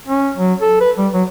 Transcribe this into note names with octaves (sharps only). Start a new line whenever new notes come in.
C#4
F#3
A4
B4
G3
F#3